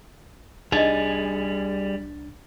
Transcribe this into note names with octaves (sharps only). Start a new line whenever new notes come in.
C2 G3 D4 D#4 G#4 D#5 A6